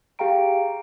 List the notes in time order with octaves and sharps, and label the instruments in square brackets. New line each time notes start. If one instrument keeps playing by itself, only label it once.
[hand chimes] G4 G#4 F5 G5 A#5 D7